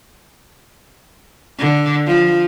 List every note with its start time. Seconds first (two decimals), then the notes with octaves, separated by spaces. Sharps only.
1.58 D3
2.06 F3